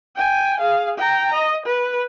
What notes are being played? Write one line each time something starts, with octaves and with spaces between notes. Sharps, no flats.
G5 G#5
G#4 F5
G5 A#5
D#5
B4